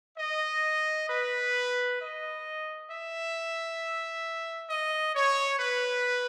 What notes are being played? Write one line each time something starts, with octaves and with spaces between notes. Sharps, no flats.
D#5
B4
D#5
E5
D#5
C#5
B4